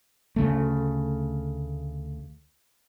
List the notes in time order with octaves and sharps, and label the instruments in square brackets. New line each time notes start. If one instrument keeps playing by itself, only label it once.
[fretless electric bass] D2 C#3 A3